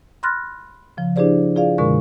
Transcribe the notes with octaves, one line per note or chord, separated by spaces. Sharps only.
B5 C6 F6 F#6 A6 A#6
C#3 F3
D4 E4 G4 G#4 C5 D5
F4 G#4 D5 F5
F#2 B2 D3 G#3 A#4 C#6